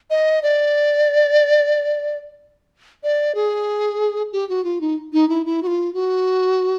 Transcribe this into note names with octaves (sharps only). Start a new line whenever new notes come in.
D#5
D5
D5
G#4
G4
F#4
F4
D#4
D#4
E4
E4
F#4
F4
F#4